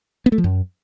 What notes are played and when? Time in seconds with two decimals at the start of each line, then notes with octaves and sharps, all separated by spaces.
0.26 B3
0.32 A3
0.38 F3
0.44 F#2